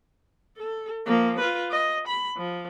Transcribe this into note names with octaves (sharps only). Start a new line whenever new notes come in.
A4
F3 A#3
F4 B4
D#5
B5
F3